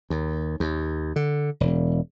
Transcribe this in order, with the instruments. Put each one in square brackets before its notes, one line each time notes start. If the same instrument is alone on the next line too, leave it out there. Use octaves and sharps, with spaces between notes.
[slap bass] D#2
D#2
D3
E1